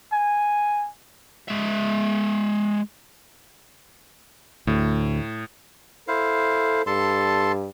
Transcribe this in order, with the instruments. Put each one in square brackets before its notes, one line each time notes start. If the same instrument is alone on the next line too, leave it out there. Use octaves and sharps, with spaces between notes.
[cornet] G#5
[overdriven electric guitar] G#3 E5
[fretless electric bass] D2 [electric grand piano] A2
[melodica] E4 C5 F5 [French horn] A4
[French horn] G2 [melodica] A4 A5 C6